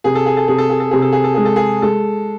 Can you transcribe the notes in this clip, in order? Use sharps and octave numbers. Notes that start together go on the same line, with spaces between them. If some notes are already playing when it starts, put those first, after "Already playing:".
C3 G#4
A4
G#4
A4
C3 G#4
A4
G#4
A4
C3 G#4
A4
G#4
A4
G#3 G#4
A4
G#4
G#3 A4